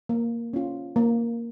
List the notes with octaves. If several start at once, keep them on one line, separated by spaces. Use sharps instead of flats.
A#3
C#4 F4
A#3